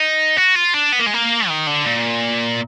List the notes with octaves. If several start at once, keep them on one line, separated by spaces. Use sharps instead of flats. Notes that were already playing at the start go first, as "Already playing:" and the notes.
Already playing: D#4
F#4
F4
D4
B3
A#3
G#3
A#3
D#3
D3
A#2